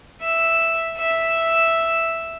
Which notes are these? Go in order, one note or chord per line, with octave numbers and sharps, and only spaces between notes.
E5
E5